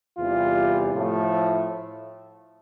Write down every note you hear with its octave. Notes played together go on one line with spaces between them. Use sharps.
E2 C3 E3 G3 F4
A2 F3 A3